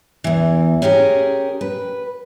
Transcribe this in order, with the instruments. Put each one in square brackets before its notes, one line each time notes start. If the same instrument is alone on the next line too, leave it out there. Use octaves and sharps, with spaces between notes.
[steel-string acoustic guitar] E2 E3
C#4 G4 G#4 A#4
B4